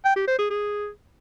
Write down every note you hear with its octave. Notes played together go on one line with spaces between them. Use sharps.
G5
G4
C5
G#4
G#4